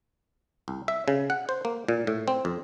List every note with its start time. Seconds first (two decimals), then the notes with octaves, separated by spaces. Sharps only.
0.68 C2
0.88 E5
1.08 C#3
1.30 F#5
1.49 C5
1.65 A#3
1.88 A#2
2.07 A2
2.28 C4
2.45 F2